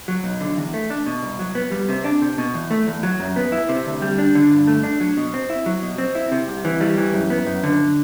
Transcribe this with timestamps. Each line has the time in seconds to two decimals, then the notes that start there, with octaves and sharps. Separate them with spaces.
0.08 F#3
0.24 B1
0.41 D3
0.57 E2
0.74 A3
0.90 D4
1.06 B2
1.23 C2
1.39 F#3
1.55 B3
1.72 G3
1.89 C3
2.04 D4
2.22 C3
2.38 B2
2.55 E2
2.71 A3
2.87 E2
3.03 F#3
3.20 F#2
3.36 B3
3.52 E4
3.69 C3
3.86 D2
4.02 G3
4.18 D4
4.35 D3
4.51 G2
4.67 A3
4.83 D4
5.00 F#3
5.17 B2
5.34 C4
5.50 E4
5.66 F#3
5.82 B2
5.98 C4
6.15 E4
6.32 C3
6.48 C2
6.65 E3
6.81 G3
6.98 E3
7.14 F#2
7.30 B3
7.47 F#2
7.63 D3